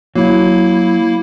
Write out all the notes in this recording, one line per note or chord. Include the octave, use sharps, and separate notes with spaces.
F#3 A#3 E4